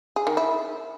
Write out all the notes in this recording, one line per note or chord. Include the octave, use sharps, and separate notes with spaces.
G#4
D#3
E4